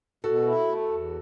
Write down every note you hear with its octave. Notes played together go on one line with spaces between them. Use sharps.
B2 F#4 A4
E4
A3
E2